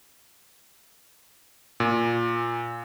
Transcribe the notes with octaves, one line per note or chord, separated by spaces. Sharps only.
A#2